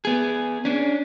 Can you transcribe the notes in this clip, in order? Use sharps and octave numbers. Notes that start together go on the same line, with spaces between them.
B3 G#4
C#4 D4